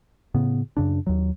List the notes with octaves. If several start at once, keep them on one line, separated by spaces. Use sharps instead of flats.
A2 C#3 B3
F#2 C#3 D4
D#2 F#3